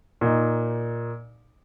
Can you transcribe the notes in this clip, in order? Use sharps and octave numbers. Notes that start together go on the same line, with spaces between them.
A#2 D#4 D#5